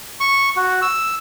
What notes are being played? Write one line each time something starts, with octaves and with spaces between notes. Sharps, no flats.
C#6
F#4
E6